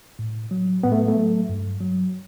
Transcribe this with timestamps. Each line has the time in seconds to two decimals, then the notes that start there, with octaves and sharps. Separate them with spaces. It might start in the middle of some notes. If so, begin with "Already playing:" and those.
0.19 A2
0.51 F#3
0.83 A2 B3
0.92 A3
1.08 A3
1.16 F#3
1.49 G2
1.81 F#3